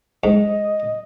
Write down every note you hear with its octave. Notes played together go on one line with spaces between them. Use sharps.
G#2 D#5